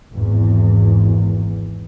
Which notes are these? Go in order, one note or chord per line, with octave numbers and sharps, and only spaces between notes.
G#1 E2